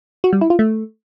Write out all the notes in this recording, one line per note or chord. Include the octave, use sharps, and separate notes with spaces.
F#4
G3
E4
F4
A3